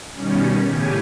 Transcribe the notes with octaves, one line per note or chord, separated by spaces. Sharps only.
B2 D#3 G3 C#4
A2 C#3 G4 G#5